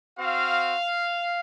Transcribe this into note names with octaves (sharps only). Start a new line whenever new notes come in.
C4 F#4 F5